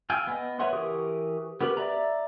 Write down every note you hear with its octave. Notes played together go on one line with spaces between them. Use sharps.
F5 G5 G#5 E6
B3 D#5
B4 C#5 E5 F#5 C6
E3 G4 A#4 C#6 D#6
B3 G4 A#4 B4
D5 E5 A#5